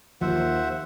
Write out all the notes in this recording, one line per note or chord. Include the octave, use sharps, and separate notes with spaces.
D#2 F3 C5 E5 F#5